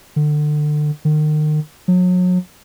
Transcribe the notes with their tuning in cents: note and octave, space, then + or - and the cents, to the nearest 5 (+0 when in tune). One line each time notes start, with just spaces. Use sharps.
D3 +30
D#3 -35
F#3 -35